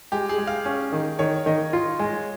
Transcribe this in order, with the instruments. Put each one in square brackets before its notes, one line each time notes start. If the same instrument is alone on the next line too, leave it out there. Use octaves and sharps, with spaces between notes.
[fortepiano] G#3 [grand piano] G4
[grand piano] G#4
[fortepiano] G#3
[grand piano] F5
[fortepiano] C#4
D#3
[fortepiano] D#3 [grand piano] C#5
[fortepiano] D#3 [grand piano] D#5
[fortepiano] F4
G#3